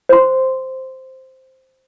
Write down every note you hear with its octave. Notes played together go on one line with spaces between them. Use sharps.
C5 C6